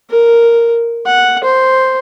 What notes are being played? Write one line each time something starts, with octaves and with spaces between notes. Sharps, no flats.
A#4
F#5
C5